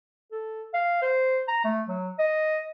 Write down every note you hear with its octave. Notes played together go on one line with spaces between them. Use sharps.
A4
F5
C5
A#5
A3
F#3
D#5